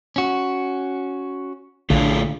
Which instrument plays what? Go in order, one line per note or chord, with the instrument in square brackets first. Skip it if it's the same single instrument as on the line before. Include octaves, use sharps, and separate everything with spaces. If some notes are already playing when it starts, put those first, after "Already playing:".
[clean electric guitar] C#4 F#4
[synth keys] A#1 [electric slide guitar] A2 A3 F4 [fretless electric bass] D3